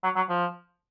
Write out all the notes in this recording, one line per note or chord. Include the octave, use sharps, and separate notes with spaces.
F#3
F#3
F3